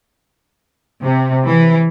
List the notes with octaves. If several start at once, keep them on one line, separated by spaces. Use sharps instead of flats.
C3
E3